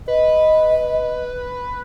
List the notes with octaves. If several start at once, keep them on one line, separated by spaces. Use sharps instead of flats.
B4 D#5